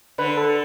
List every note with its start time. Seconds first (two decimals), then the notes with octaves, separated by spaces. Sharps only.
0.18 D3 B4
0.37 A4